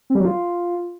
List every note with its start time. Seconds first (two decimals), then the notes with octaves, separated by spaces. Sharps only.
0.10 C4
0.15 G3
0.20 F#3
0.25 F4